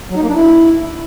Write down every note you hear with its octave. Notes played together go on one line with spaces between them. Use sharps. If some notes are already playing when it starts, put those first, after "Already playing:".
F#3
D#4
A#3
D4
E4